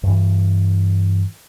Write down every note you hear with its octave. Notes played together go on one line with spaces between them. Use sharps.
G2 E3